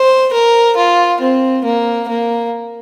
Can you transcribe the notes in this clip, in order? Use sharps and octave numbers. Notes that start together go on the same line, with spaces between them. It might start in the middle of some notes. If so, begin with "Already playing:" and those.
Already playing: C5
A#4
F4
C4
A#3
A#3